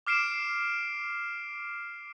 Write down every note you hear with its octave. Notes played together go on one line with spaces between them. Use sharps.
D6 F6 C7 D7 E7